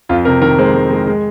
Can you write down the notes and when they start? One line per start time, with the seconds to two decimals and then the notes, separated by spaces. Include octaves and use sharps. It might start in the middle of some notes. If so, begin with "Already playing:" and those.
0.09 F2 F4
0.25 C3 A#4
0.41 D#3 A#4
0.58 G#3 C5
0.75 G#3
0.91 G#3
1.07 G#3